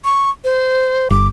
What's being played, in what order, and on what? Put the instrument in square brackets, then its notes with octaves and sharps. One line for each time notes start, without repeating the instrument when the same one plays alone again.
[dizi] C#6
C5
[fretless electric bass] G1 [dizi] D6